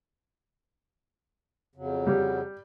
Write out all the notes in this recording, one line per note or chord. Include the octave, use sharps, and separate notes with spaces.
F2 C#3 F#3
G3